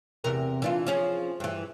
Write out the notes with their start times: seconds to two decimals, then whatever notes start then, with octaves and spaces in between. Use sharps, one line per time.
0.24 E2 C3 A#4
0.62 E3 D4 F4
0.87 F3 C#4 G#4
1.40 G2 E3